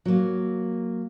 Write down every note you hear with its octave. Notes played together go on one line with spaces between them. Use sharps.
F#3 A#3